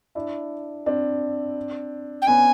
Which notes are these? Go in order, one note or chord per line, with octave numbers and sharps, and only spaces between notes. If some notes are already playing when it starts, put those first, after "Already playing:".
D4 E4
C4 D4
G5
B3 C#4 G#5